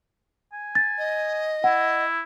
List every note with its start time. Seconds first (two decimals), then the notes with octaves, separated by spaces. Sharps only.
0.53 G#5
0.75 A6
0.98 D#5
1.64 E4 F#5